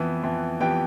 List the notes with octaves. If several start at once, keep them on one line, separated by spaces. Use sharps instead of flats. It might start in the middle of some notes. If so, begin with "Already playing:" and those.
Already playing: F2 E3 B3
F2 E3 B3
F2 E3 B3 G4 G5